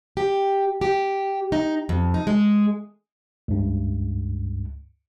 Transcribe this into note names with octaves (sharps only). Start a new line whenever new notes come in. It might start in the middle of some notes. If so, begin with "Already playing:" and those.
G4
G4
D#4
F2
D#4
G#3
C#2 G2